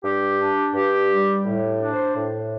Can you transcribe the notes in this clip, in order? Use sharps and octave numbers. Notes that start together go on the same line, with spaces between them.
G2 G4
D4
G2 G4
G3
A2
D4
C5
A2